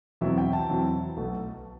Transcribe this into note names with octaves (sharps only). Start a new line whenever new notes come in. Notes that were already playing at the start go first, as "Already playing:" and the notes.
E2 B2 F#3 C4 E4 E5
G5
A5
E2 B2 F#3 C4 E4
B1 B2 A3